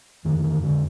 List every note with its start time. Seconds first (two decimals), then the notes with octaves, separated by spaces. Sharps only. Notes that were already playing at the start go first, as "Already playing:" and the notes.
0.25 F2 D3 D#3
0.44 D#3
0.63 D3